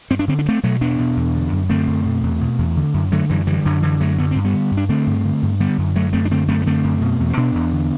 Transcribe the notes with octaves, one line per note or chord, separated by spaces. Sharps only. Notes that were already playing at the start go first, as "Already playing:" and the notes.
G2 C4
D4
D3 C4
D4
G2
A3 C4
B2 F#3 A3
E2 B3 D4
B2
E2
D3
F#2
D3 A3 C4
F#2
B2
E2
B2
E2
D3
F#2
D3 F#3 A3
F#2 E3 G3
D3 E3 G3
F#2 D3 F#3
D3 E3
F#2 F#3 A3
D3 B3
G2 C4
G3 B3
D3
G2
D4
D3 A3 C4
G2
D3
G2
D3 G3 B3
F#2
D3 F#3 A3
F#2 A3 C4
D4
D3 A3 C4
F#2 A3 C4
B3
D3 A3 C4
F#2
B2
E2
C4
B2 B3 D4
E2
D3